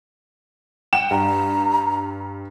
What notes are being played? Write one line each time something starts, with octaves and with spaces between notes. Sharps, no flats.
F#5 G5 E7
G2 A#5